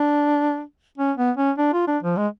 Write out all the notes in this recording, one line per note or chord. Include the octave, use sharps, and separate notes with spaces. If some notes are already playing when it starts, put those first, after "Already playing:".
Already playing: D4
C#4
B3
C#4
D4
F4
D4
F3
G#3